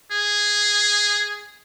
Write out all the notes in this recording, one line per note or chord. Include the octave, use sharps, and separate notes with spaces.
G#4